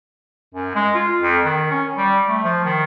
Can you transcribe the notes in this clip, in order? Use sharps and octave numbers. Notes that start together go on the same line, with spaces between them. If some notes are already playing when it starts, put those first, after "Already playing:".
F#2
G#3
F4
F2
D#3
C#4
G3
A3
F3
D#3